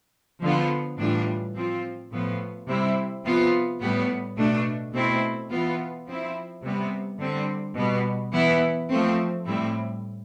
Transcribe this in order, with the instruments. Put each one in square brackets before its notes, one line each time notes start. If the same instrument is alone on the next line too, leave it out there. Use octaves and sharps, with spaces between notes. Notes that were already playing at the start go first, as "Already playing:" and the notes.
[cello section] D3 F3 B3 F4
A2 E3 G3 D4 F4
F3 C4 F4
A2 F3 B3
C3 G3 C4 E4
C3 F3 B3 F4
A2 G3 B3
B2 A3 D4
B2 A3 C4 E4
E3 B3 F4
F3 C4 E4
C3 G3 B3
D3 G3 C4
B2 G3 B3
E3 B3 E4
F3 A3 C4
A2 G3 C4 E4